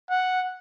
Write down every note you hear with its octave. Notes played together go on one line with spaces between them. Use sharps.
F#5